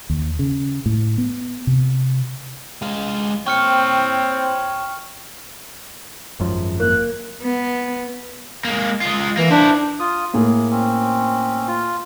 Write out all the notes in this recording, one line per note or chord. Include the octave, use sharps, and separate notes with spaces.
D#2
C#3
A2
B3
C3
G#3 F5
C4 C#5 G5 C#6 F6 C#7
G#1 F#2 F3
A#3 F#6
B3
G#3 A#3
G#3 F4
E3 A#3
D4 E4 C5
F4 D#6
A2 A#3 G#4
C4 C#4
F4